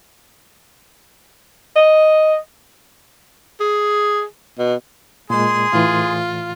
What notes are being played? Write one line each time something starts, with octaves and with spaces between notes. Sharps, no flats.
D#5
G#4
B2
A#2 G#3 G#4 C6
A2 E3 F4